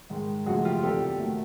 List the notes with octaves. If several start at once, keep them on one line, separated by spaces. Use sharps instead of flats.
G#2 D#3 G#3
F#2 C#3 F3 A3 F#4 G#4
F4 G4
E2 C3 D#3 G3 G4 A4
D#3 F#3 A3